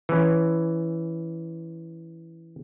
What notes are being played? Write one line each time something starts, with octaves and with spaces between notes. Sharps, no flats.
E3 C#4